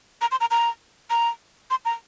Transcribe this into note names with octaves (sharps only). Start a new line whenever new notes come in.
A#5
C6
A#5
A#5
A#5
C6
A#5